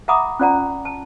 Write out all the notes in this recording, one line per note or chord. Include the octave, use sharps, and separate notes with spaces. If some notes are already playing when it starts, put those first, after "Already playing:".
E5 F#5 A#5 B5 D6 D#6
C#4 F4 D5 F#5 A#5
A5